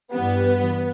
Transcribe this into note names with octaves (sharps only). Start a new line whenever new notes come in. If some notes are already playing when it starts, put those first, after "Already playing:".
G2 E3 G3 B3